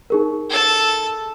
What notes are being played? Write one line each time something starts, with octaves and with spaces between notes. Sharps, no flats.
D#4 G#4 A#4
A4 A5